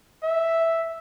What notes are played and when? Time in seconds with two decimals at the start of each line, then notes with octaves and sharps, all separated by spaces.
0.23 E5